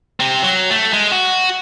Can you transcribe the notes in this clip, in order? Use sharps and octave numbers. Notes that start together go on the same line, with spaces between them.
C3 C4
F#3
A3
G#3
F#4